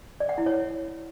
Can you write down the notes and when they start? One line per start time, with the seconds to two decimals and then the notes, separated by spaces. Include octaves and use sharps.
0.20 D5
0.29 F#5
0.38 E4
0.46 C#5